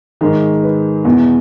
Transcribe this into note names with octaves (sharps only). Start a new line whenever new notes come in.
G#2 D#3 G#4
B4
E2 B2